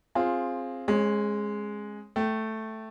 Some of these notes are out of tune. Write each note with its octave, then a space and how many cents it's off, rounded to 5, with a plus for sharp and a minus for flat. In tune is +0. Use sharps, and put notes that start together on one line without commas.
C4 +15 F4 +0 G#4 +0
G#3 +0 C#4 -35
A3 +0 G5 -20